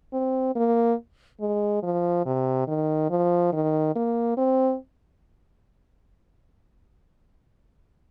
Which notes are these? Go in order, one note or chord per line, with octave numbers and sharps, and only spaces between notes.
C4
A#3
G#3
F3
C3
D#3
F3
D#3
A#3
C4